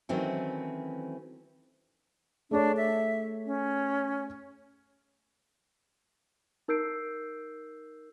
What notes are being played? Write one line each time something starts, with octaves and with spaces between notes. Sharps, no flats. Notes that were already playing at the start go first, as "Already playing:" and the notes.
D#3 E3 F#3 A3 C4 C#4
A3 D4 G#4 C#5
E5
C#4
D#4 A#4 E6 G6 C7 D7